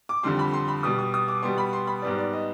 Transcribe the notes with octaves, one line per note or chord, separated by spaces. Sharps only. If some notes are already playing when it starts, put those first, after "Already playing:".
D6
F2 D3 G3 C6
B5
C6
B5
B2 G3 B3 D#6
D#6
D#6
D6
B2 G3 B3 C6
B5
C6
B5
G#2 G3 B3 D5
D5
D#5